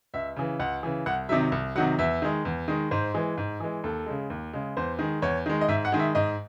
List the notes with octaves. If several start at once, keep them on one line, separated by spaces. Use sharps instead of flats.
C#2 E5
C#3 E3
C#2 F#5
C#3 E3
C2 F#5
C3 D#3 F#3 E5
C2
C3 D#3 F#3 F#5
E2 E5
D#3 G#3
E2
D#3 G#3
G#2 C5
E3 G#3
G#2
E3 G#3
D#2 A4
C#3 G#3
D#2
C#3 G#3
E2 C5
D#3 G#3
E2 C#5
D#3 G#3
D#5
G#2 E5
F#5
D#3 G#3
E5
G#2 D#5